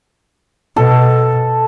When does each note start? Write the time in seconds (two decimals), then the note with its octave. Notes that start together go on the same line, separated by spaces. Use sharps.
0.76 B2 A4